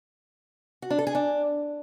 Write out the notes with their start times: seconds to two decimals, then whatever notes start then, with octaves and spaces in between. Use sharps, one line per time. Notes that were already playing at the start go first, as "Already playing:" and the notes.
0.82 F#4
0.90 D4
0.99 A4
1.07 G#4
1.15 D4